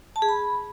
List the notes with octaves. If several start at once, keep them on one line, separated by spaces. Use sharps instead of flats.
A5
G#4
B5